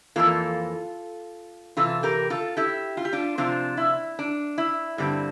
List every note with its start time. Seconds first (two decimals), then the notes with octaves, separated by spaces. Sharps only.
0.16 F2 E3 A#3 F4 A4
1.77 C3 E3 F4 A4
2.03 G4 A#4
2.30 F4 A4
2.57 E4 G4
2.97 F4
3.05 G4
3.13 D4 F4
3.38 C3 F3 C4 D4 F4
3.77 E4
4.19 D4
4.58 E4
4.98 G2 D3 G3 C4